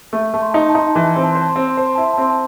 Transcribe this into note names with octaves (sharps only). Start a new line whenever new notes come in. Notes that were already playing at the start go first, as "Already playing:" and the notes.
A3
A3 A5
C6
D#4 A5
C6
A5
D#4 C6
A5
E3 C6
A5
C4 C6
A5
C5 C6
A5
C6
C4 A5
C6
C5 A5
C6
E4 A5
C6
A5
C4 C6
A5